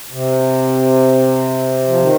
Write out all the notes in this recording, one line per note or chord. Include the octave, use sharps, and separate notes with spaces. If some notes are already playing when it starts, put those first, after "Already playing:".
C3
F3
D#3